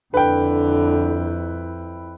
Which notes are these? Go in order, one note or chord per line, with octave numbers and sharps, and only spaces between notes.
F2 D3 E4 B4 G5